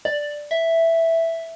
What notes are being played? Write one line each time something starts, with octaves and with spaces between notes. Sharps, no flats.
D5
E5